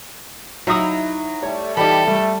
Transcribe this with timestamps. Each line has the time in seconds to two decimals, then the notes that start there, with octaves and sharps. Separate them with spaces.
0.67 F#3 D#4 E4 E5 D#6
1.43 G3 A3 C#5
1.77 E3 G3 D#4 G4 A4 D5 B5
2.07 G3 A3